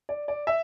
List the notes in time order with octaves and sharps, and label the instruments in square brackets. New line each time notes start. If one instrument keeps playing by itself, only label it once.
[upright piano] D5
D5
E5